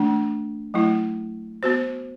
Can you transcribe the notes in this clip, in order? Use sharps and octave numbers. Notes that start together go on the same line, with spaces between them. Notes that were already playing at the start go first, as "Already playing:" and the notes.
Already playing: E3 A3 D4
F#3 A3 E4
B3 F#4 C5